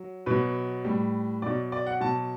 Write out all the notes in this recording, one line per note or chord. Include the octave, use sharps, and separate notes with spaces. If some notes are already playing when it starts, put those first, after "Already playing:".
Already playing: F#3
B2 F#3 B4
A2 G3
B2 F#3 D5
D5
F#5
B2 F#3 A5